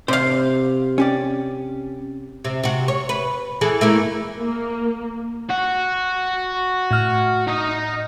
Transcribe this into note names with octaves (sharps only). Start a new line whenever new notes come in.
C3 C5 F5
C#4 G4 D5
C3
C3 F#4
C#5
B4
E3 G#4 A4
A3 A#3 E4
A#3
F#4
A2 F6
D#4 D#5